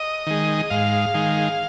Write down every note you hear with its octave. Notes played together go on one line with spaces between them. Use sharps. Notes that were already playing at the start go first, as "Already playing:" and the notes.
Already playing: D#5
D#3 G#3
G#2 F5
D#3 G#3